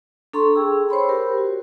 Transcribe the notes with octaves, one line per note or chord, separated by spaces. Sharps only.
D4 A4 A#5 C6 C#6
G#4 G5 E6
C5 C#5 B5 C6
G4 A#4 C5
F#4